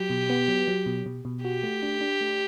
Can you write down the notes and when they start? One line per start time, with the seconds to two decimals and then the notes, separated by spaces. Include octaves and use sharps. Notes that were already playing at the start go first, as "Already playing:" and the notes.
Already playing: F#3 G4
0.10 B2
0.30 B3
0.48 F#3
0.68 F#3
0.86 B2
1.06 B2
1.25 B2
1.44 F#4 G4
1.63 A3
1.82 D4
2.01 D4
2.21 A3